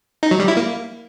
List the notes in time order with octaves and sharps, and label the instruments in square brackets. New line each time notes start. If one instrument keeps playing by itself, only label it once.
[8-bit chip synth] D#4
F#3
G3
E4
A#3